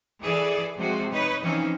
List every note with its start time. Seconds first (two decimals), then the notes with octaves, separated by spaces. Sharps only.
0.21 E3 G#4 A4 D5
0.77 C3 F3 G#3 F#4 C5
1.11 D#4 B4 C#5 D#5
1.43 E3 F3 C4 C#4 D#4